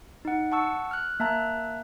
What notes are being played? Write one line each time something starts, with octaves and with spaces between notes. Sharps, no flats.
D#4 F#5
F#5 A5 C#6 E6
F6 F#6
A#3 E5 A5 A#5 F#6